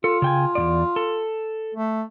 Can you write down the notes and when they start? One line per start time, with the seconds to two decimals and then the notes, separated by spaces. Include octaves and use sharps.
0.04 F4 A4
0.22 C#3 G5 G#5
0.55 E2 G#2 D5
0.96 A4
1.75 A3